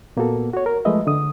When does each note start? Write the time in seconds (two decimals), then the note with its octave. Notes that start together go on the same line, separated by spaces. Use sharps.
0.17 A#2 A#3 B3 F#4 A4
0.53 F#4 C#5
0.66 A#4
0.85 F3 G#3 A3 B4 D#5 E5
1.07 D3 D#6